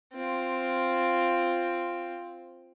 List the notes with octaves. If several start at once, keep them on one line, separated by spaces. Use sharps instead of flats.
C4 F4